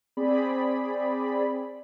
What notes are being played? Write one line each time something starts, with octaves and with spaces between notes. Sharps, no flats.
C4 G#4 D5 B5